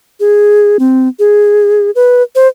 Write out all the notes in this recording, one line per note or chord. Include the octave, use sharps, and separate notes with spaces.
G#4
C4
G#4
B4
C5